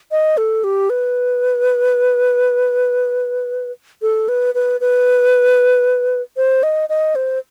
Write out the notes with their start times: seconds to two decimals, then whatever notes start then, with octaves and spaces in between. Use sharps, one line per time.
0.11 D#5
0.37 A4
0.64 G4
0.90 B4
4.02 A4
4.29 B4
4.55 B4
4.81 B4
6.37 C5
6.63 D#5
6.89 D#5
7.15 C5